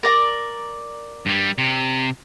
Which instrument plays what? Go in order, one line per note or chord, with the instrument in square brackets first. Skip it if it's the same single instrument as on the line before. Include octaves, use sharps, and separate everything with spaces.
[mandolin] A#4 D5 A#5
[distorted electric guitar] G2 G3
C3